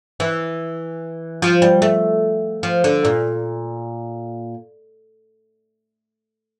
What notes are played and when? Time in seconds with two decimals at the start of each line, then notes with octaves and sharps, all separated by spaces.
0.20 E3
1.42 F3
1.62 G3
1.82 A3
2.63 F3
2.84 D3
3.05 A#2